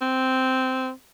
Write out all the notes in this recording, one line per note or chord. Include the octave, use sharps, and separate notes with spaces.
C4